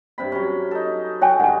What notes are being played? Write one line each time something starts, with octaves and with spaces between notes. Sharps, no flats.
G2 C3 B5
F#3 C#4
D#4 A4
F#4 C#5 G5 G#5
G2 D#3 G#3 F#5 G#5